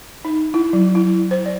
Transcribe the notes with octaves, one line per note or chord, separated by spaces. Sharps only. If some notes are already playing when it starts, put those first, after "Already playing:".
D#4
E4
F#3
E4
C5
D5